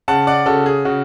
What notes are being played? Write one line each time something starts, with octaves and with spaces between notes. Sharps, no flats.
C#3 F#5 A5
D5 F#5
C#3 F#4 A4
G#4
C#3 F#4